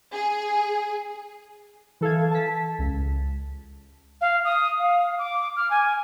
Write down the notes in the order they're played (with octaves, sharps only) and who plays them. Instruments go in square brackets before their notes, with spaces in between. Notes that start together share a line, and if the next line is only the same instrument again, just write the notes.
[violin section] G#4
[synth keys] E3 A4 F5 G#6
A5 B6
C#2
[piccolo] F5
D#6
F5
D6
F6
G#5